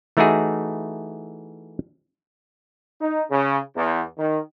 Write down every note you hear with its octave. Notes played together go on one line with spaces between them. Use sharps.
E3 A3 D#4 E4 F#4 G#4
D#4
C#3
E2
D#3